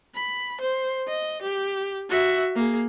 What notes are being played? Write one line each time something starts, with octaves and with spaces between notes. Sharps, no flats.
B5
C5
D#5
G4
F#4 E5
A#3 G#4